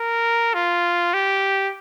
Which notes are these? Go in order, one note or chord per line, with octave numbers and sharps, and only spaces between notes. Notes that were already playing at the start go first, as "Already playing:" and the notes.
Already playing: A#4
F4
G4